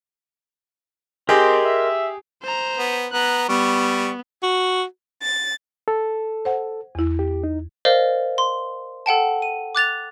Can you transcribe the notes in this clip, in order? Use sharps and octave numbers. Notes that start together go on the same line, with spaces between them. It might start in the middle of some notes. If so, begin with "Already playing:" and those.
C4 G4 G#4 A#4 D#5 C6
E5
C5 A#5
B3
B3 A#5 F#6
G3 B3 C#6
F#4
A6
A4
C5 F#5
E2 E4
G4
D#4
A#4 C5 D5 D#5 F5
C6
A4 F#5 G5 A5
D#7
D6 F#6 A6 F7